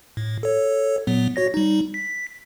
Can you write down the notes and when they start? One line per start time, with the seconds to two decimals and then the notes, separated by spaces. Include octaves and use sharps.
0.17 A2
0.43 A4 C#5
1.07 A#2 F#3 B3
1.36 F#4 C#5 A#6
1.54 G3 D#4
1.94 B6